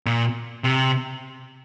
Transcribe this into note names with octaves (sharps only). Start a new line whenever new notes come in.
A#2
C3